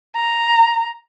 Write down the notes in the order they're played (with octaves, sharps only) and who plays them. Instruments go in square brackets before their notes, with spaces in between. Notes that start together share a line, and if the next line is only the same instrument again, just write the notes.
[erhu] A#5